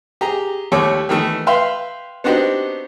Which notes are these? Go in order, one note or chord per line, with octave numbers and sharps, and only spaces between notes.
G4 G#4 A#5
D#2 G3 A3 C#5 D6
D#3 E3 A3
B4 E5 F5 G5 C6
B3 C4 D4 D#4 F#4 G4